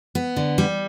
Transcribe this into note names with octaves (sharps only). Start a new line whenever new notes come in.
B3
D3
G3